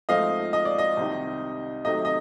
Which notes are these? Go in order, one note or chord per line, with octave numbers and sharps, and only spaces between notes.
G#2 F3 A3 C4 D#5 F5
D#5
D5
D#5
C2 C3 D#3
C3 D#3 F#3 A3 D#5
D#5